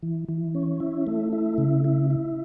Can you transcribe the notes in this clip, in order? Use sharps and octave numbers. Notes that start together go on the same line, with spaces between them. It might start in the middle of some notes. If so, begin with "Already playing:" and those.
E3
E3
C#4
E4
A3
E4
C#3
E4
E4